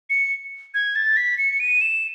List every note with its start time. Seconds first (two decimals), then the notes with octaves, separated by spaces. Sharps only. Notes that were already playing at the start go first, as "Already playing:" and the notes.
0.10 C#7
0.74 G#6
0.96 A6
1.17 B6
1.38 C#7
1.60 D#7
1.81 E7